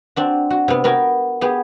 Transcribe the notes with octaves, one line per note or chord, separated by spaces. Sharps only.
C4 D4 F#4
F#4
C3 B3
B3 F#4 A#4 B4 G5 G#5
B3 G4 G#4